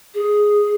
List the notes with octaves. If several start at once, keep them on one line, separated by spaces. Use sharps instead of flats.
G#4